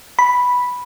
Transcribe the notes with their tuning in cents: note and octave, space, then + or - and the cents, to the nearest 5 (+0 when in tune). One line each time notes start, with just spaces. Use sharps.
B5 -5